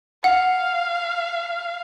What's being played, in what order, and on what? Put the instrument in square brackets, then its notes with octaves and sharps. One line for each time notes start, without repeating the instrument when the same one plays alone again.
[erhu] F5 [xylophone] F#5